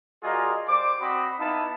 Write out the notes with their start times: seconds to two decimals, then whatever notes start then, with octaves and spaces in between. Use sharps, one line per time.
0.23 G3 F4 F#4 G#4 A#4 D#5
0.68 G3 C5 D5 D6
1.01 C4 F#4 D#5 B5
1.39 B3 D#4 E4 F5 A5 B5